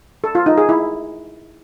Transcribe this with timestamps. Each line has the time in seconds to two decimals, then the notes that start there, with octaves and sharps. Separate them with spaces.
0.24 A4
0.35 F4
0.46 D#4
0.58 G#4
0.69 E4